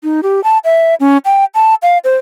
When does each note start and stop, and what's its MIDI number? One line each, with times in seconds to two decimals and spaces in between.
0.04 0.21 63
0.23 0.43 67
0.44 0.58 81
0.65 0.95 76
1.00 1.18 61
1.25 1.45 79
1.55 1.75 81
1.83 1.98 77
2.04 2.15 72